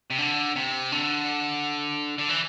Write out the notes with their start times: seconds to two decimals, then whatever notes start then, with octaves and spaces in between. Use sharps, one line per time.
0.10 C3
0.18 D3
0.56 C3
0.92 D3
2.18 D3
2.29 E3